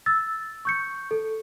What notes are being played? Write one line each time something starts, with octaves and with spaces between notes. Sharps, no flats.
E6 A6
C#6 G6 C#7
A4